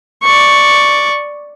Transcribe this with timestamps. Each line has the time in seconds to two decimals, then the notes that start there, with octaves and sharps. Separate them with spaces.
0.23 D5 C#6